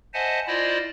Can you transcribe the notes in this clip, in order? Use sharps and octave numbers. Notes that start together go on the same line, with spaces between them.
C5 D#5 E5 F#5 G#5 A5
E4 F4 C5 D5 D#5